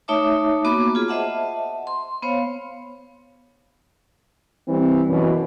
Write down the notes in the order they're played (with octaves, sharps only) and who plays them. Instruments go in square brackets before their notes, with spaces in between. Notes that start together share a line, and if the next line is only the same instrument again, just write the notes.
[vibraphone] A3 D#4 C#5 E5 A5 D6
A#3 B3 F#4 B5 D6
F4 G#4
C5 D#5 E5 F#5 A5
C6
B3 C5 C#5 F5
[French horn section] E3 G3 C4
F#2 B2 E3